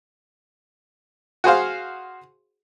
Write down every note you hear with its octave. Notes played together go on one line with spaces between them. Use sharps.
F#4 G#4 C5 F5